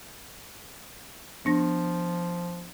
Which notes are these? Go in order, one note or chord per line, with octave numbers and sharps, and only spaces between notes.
F3 B3 D4 A#6